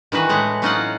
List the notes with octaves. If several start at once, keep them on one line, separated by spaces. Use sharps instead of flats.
D#3 E3 F#4 B4
A2 G#3 F#5
F#3 C#4 D#4 F4 C5 F#5